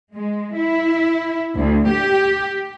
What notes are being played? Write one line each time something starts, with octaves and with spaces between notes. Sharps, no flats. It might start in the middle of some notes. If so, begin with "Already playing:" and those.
G#3
E4
D2
G4